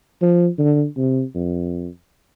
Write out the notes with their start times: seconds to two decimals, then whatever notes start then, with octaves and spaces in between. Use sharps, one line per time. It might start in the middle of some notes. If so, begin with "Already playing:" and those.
0.22 F3
0.59 D3
0.97 C3
1.35 F2